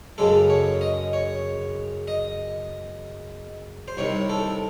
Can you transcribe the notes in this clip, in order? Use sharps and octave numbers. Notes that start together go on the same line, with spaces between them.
F#2 C#3 G#3 A4
C#5
D#5
C#5
D#5
C5
C2 C3 D#3 C#5
A4